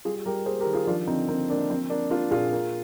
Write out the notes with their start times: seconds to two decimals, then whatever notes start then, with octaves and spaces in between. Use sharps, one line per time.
0.05 G3 F4 G#4
0.26 G3 G4 A#4
0.46 A#3 G#4 C5
0.60 G4 A#4
0.66 D#3
0.73 F4 G#4
0.87 F3 D4 F4
1.07 D3 C4 D#4
1.29 A#3 C4
1.50 A#3 D4
1.70 F3 C4
1.90 A#3 D4
2.10 A#3 D4 F4
2.31 A#2 F4 G#4
2.52 A#3